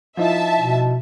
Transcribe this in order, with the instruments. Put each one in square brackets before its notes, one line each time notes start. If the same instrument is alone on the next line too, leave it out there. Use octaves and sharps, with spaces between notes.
[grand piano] F3 D#4 E4 [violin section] E5 A5
[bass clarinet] B2